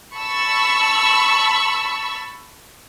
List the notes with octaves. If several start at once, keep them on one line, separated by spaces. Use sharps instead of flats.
A5 B5 C#6 E6